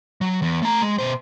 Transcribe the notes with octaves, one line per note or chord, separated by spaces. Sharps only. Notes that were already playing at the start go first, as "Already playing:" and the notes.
F#3
E2
A3 A#5
G#3
B2 C5